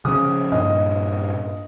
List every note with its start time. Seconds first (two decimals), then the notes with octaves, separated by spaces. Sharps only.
0.05 C#3 F3 C#4 D#6
0.52 G2 A#2 D#5